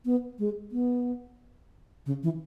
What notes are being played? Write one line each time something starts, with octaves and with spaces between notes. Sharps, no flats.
B3
G#3
B3
C#3
E3